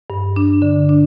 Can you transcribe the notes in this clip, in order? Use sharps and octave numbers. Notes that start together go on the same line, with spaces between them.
G2
D4
D3
D4